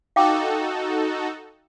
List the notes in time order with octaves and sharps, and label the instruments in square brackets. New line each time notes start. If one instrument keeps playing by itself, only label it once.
[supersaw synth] D#4 F#4 A4 [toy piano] F5 G5 D6